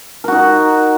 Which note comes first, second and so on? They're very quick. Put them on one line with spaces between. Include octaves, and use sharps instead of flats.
A#4 F#4 D#4